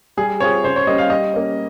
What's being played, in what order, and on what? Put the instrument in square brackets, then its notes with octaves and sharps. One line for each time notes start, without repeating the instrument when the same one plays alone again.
[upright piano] G3 [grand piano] G#4
[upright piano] C4 F4 G#4 [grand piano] C#5
[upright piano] C#3 [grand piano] C5
[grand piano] C#5
[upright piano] G3 A#3 C#4 [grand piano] D#5
[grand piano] F5
[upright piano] G3 [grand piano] D#5
[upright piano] A#3 C#4